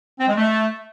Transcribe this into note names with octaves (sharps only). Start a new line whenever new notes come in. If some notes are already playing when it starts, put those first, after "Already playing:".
C4
G#3
A3